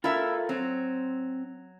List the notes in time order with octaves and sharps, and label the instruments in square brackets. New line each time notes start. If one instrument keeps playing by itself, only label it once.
[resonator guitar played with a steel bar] E4 E5 [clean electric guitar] F4 A4 A#4
[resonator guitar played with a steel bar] F#3 [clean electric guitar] C4